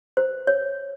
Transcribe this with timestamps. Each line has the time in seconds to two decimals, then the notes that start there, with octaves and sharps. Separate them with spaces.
0.17 C5
0.47 C#5